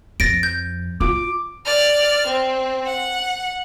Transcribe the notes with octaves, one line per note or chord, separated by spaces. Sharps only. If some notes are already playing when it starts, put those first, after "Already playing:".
F2 A6 A#6 D7
G6
F4 D6
D5 F6
C4
F#5